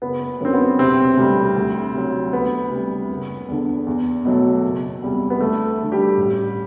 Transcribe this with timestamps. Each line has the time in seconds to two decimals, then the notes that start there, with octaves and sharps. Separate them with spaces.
0.02 F#1 B3
0.40 F#2 D3 F#3 C4
0.53 B3
0.79 E1 C3 C4
1.17 D2 C3 G3
1.56 D2
1.94 C3 F#3
2.33 D2 B3
2.71 C3 G3
3.09 F#1
3.48 E2 D3
3.86 E2
4.25 B2 F#3 A3
4.63 F#1
5.02 E2 C3 G3
5.30 B3
5.40 D2 A3
5.79 D3 A3
5.92 G3 G4
6.17 A1